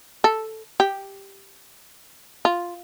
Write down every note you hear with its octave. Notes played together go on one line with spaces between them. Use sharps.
A4
G4
F4